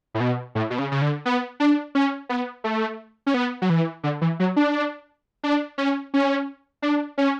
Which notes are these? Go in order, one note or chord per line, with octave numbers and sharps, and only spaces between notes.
A2
B2
A2
B2
C#3
C#3
D3
B3
D4
C#4
B3
A3
C#4
B3
F#3
E3
D3
E3
F#3
D4
D4
C#4
C#4
D4
C#4